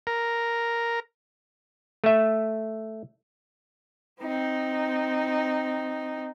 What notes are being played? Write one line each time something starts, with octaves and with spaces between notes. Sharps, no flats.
A#4
A3 E5
C4 D#4